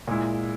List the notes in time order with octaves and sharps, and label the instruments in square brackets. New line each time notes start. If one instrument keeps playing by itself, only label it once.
[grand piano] A#2 G#3 E4